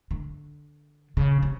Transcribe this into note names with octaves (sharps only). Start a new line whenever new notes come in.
D3
C#3
C3